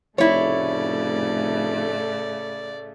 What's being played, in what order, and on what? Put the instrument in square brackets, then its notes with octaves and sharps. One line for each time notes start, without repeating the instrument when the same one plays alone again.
[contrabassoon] F1 [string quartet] A2 C#3 A3 [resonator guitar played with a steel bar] E4 C#5 [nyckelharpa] D5